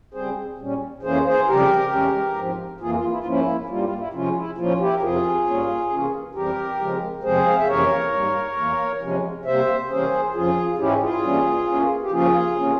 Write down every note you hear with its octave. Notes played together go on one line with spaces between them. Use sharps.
C#3 G3 C4 G#4 C5
A#2 G3 C#4
F2 E3 A#3 C#4 G#4 C5
G#4 C5
F2 C#3 G3 G4 A#4
E2 E3 G#3 C#4
G#2 F3 C4
F2 E3 A#3 F4 G#4
F4
E4
F4
G#2 F3 A#3 C#4 E4
G2 G3 A#3 F4
F4
E4
C3 F3 G#3 C#4 F4
E4
A#2 F3 A#3 C#4 F4
E4 G4
A#4
F2 C3 F3 F4 G#4
G#2 G3 A#3 C#4
C3 E3 A#3 C#4
F2 E3 G3 C4 G4 A#4
C#3 F3 G#3 C4
E2 C3 F3 G#3 C4 G#4 C5
F5
E5
F2 C3 E3 A#3 C#4 A#4 C#5
G#2 G3 A#3
E2 E3 A#3
E2 C3 F3 G#3 C#4
C3 G3 A#3 C5 E5
C3 E3 G3 A#3 C#4 G#4 C5
F2 C#3 F3 F4 G#4
G#2 E3 G#3 C#4 E4 G4
F4 G#4
G2 E3 G3 A#3 C#4
E2 E3 A#3 C#4
G4
C#3 F3 A#3 C#4 F4 G#4
C3 E3 A#3 C#4